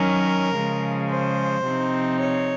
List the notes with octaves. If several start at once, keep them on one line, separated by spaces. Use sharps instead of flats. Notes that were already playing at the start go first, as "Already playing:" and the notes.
Already playing: D#3 F#3 C#4 A#4
C#3 F3 G#3
C5
C3 F3 C4 D#4
C#5